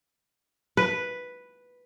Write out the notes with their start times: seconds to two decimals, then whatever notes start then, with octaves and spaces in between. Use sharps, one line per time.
0.77 B4